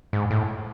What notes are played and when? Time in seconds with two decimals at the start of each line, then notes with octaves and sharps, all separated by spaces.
0.13 G#2
0.31 A2